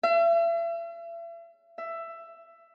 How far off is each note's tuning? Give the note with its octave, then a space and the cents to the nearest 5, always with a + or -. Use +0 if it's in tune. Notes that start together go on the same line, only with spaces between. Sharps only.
E5 +40
E5 +15